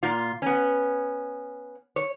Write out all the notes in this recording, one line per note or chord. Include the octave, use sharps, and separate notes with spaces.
A#2 F4
B3 C#4
C#5